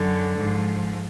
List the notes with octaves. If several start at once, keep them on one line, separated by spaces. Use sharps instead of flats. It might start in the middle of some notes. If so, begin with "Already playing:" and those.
Already playing: F#2 D3 F#3
G#2 F3